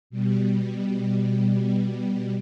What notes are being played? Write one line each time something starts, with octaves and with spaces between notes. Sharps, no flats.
B2 G3